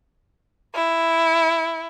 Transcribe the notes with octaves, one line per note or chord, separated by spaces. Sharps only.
E4